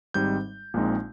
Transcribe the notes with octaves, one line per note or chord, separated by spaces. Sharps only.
G#1 G#2 G3 C4 D#4 G6
A#1 A#2 G#3 C4 D#4